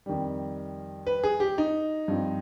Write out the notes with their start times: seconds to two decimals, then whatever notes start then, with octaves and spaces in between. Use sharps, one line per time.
0.06 F2 D#3 G3
1.07 B4
1.23 G#4
1.40 G4
1.58 D#4
2.08 G2 F3 C4